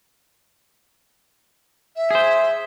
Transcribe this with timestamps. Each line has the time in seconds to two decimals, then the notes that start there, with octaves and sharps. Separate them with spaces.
1.96 E5
2.11 G#4 C5